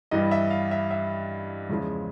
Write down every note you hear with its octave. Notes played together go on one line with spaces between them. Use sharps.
G2 E3 G3 D#5
E5
F5
E5
E5
E2 C#3 F3 G#3